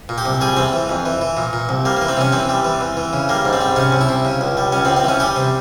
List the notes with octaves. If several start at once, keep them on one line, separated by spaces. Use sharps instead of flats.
A#2
G4
C2
G3 G#4
E2 C4
E3
F2
E3
E3
A#2
A#2
C2
G3 A#3
E3 A#3
C4
C3 C#4
E3 C4
G3
E3
E2
E3
C#3
G3 A#3
G#2
C4
G3
C3 C#4
C2
E4
C3
C#3
C#2
G3
C#2 C#4
C4
C#2
C4
E3 C#4
G3 G4
C3